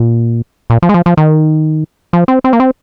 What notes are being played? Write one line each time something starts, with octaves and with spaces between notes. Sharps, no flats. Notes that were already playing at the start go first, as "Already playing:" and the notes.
Already playing: A#2
A#2
F3
G#3
F3
F3
D#3
F3
C4
C4
A#3
C4